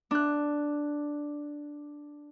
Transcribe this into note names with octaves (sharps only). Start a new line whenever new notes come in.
D4 F#6